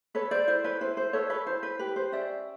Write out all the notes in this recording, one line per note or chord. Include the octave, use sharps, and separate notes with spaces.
A4 B4 C#5
C5 D5
E4 C5
B4 C#5
E4 C5
C5
A4 B4 C#5
B4 C#5
E4 C5
B4
G4 B4
C5
C#4 D5 E5